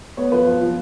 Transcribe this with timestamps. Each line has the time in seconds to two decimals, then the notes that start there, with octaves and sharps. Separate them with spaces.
0.17 B3 C#5
0.32 F3 B4
0.46 F3
0.61 F3